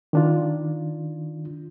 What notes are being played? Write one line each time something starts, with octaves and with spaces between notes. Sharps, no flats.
D#3 D4 F4